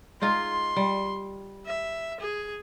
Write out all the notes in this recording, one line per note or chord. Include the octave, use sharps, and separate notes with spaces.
G#3 D#4 F4 C6
G3
E5
G#4